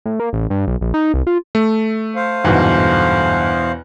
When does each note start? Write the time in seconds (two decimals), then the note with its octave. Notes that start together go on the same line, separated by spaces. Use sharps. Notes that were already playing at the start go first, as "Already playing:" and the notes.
0.05 A2
0.20 A#3
0.33 A1
0.50 G2
0.67 B1
0.81 A#1
0.94 D#4
1.14 C2
1.27 F4
1.55 A3
2.16 C5 F5
2.45 G1 E2 G#2 B2